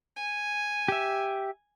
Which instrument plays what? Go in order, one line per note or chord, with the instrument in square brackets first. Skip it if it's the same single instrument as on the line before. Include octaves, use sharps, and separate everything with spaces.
[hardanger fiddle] G#5
[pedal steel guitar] G4 E5